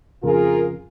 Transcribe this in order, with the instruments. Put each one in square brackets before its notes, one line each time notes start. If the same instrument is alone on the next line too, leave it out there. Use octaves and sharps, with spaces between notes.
[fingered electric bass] F2 C#3 [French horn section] F4 G#4 A#4